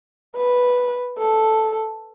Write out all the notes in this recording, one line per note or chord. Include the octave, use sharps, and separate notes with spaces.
B4
A4